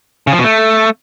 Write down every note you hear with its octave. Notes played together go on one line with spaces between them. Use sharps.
C#3
F3
B2
A3